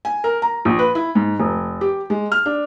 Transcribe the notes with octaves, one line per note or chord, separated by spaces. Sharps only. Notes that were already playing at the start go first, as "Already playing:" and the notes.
G#5
A#4
A#5
A#1
B4
E4
G#2
F1
G4
G#3
F6
D4